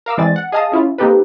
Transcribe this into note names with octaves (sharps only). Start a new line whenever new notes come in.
A#4 F5 D6 E6
E3 G#3 C4 D5 G#5 A6
F#5
G#4 D#5 F5 A5 D#6
C#4 E4 F4
A#3 C4 D#4 G4 A4 B4